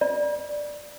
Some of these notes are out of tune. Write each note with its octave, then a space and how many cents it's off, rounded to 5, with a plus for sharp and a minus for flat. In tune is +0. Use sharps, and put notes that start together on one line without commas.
D5 +5